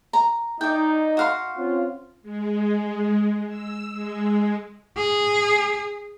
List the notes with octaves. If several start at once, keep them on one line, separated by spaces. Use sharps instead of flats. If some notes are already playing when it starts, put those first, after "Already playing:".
A#5
D#4 D5 G5
F#4 F5 C6
C4 C#4 F4
G#3
E6
G#3
G#4